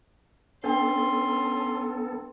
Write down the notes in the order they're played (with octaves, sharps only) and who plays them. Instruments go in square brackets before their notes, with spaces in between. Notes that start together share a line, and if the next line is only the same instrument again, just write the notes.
[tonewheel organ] B3 A4 [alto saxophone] C#4 [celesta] D4 G5 [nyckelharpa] C6